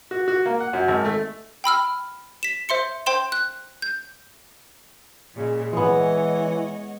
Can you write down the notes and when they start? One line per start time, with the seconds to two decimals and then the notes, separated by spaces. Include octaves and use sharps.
0.11 F#4
0.28 F#4
0.46 A#3
0.60 F#5
0.73 F#2
0.88 G#1
1.05 A3
1.64 G5 B5 E6 F6
2.43 B6 E7
2.69 C5 E5 C6 C#7
3.06 C5 G5 C6 E7
3.32 F#6
3.82 G6
5.33 A#2 C#3 G#3
5.73 E3 G#3 B3 C#5 D#5 F#5